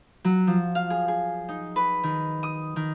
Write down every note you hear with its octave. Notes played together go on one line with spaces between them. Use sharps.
F#3
F3
F5
G#4
G#4
D#4
B4
D#3
D#6
D#3